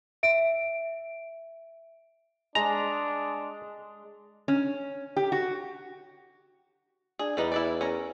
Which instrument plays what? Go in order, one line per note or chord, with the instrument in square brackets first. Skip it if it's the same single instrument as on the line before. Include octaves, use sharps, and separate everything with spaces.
[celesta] E5 D7
[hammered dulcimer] G#3 [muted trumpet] D4 [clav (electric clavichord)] A#5
[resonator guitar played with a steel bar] C#4
G4
F#4
[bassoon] D4 [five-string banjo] G#4
[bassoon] E2 [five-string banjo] G3 D#4 B4
[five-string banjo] E4 B4 D5
C#4 A#4